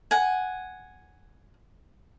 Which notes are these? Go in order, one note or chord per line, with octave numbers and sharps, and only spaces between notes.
F#5 G#5